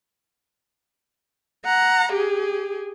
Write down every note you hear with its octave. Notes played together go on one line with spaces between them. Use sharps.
F#5 A#5
G4 G#4